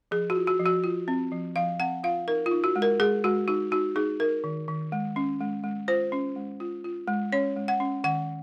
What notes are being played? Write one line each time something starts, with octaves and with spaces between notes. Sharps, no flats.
F3 G#4
F#4
F4
F#4
F3
F#4
F4
C4
F3
F3 F5
C4 F#5
F4 F5
D#4 A#4
F4
D#4
F#4
G#3
A#4
G#3 G#4
G#3 F#4
D#4 F#4
D#4 F#4
D#4 G#4
D#4 A#4
D#3
D#3
G#3
C#4
G#3
G#3
F4 C5
C#4
G#3
F4
F4
G#3
C#4 C#5
G#3
F#5
C#4
D#3 F#5